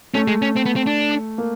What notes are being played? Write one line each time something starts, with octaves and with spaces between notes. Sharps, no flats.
A3 C#4
G#3
C#4
C4
B3
C4
D4
A#3